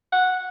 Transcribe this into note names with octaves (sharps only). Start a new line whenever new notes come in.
F#5